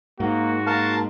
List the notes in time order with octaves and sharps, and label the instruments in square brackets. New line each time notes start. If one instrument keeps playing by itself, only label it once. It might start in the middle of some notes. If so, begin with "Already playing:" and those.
[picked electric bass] G#2 [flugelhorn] A#3 [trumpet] F#4
[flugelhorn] A#3 [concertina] A#4 F5 A5